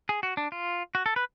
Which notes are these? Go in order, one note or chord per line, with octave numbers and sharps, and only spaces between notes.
G#4
F#4
D4
F4
F#4
A4
B4